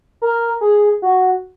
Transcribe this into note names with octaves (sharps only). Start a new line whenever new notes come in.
A#4
G#4
F#4